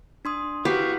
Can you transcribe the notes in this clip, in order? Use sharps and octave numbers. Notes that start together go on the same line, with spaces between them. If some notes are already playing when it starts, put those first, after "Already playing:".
D4 C6 D#6
E4 F#4 G4 B4 F5 C#6 B6